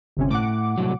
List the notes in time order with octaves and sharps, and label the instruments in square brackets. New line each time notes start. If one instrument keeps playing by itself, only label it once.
[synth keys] G1 C3 C#4
[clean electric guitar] A2 [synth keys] F#5 D6
[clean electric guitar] C2 A2 F#3